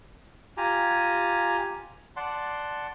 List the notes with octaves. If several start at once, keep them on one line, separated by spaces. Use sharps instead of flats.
F4 G4 G#5 A#5
D5 F#5 A5 C6